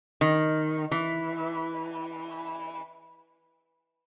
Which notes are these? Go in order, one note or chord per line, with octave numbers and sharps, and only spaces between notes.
D#3
E3